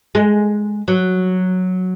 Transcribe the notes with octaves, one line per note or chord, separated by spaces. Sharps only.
G#3
F#3